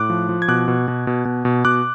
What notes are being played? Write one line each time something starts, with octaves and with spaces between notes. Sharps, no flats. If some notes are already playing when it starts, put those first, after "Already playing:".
Already playing: A2 D6 F#6
F3
F3
G#6
B2 D6 F#6
B2
B2
B2
B2
B2
B2 D6 F#6